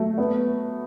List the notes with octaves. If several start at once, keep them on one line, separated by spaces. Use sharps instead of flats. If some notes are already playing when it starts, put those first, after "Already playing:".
Already playing: F#3 A3
B3